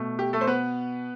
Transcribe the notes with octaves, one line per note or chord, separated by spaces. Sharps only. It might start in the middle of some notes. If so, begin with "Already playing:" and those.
Already playing: B2 A3
G4
A3 A4
C5
B3 B4